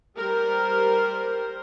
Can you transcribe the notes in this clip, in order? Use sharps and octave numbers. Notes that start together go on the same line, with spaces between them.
G3 A#4 C5